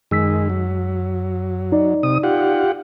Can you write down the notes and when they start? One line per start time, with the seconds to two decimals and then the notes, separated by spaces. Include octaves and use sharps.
0.11 F#2 D#3 G#3 E6 B6
0.50 F#3
1.72 D#4 D5
2.03 C3 D#6
2.23 F4 G4 F#5